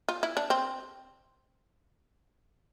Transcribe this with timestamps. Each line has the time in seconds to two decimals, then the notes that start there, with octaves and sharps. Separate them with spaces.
0.09 F4
0.23 E4
0.37 D4
0.50 C4